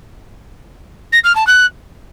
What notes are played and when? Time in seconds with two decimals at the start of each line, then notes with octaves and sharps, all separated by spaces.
1.12 A#6
1.24 F6
1.35 A5
1.47 F#6